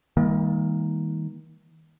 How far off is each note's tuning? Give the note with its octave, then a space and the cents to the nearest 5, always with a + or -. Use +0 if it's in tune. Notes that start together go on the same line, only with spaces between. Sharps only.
D#3 +35 G3 +40 A#3 +0